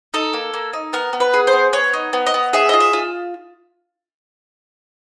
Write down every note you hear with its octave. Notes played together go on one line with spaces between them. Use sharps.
D#4 A4
A#3
A#3
D#4
B3 A#4
B3
B4
G#4
C5
B3
B3 C#5
D#4
B3
D#5
B3
G#4 E5
F4 D#5
E5
F4